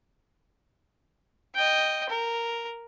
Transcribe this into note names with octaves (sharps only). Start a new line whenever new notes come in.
D#5 G5
A#4